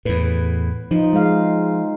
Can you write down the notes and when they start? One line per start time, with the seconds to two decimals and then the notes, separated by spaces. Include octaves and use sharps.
0.06 E2 A2 B4
0.91 F3 D#4 F4
1.13 G#3 F5